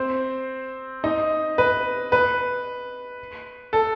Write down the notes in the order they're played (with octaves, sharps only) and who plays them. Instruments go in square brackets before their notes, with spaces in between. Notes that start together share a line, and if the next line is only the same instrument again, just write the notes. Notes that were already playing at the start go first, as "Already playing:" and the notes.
Already playing: [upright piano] C4 C5
D#4 D#5
B4
B4
A4